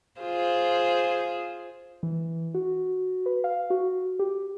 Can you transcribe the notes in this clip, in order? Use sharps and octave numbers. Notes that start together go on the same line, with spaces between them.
F4 G#4 C5
E3
F#4
B4
F5
F#4
G4